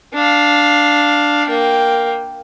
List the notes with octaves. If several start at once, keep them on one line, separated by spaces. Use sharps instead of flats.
D4 F5
A#3 G5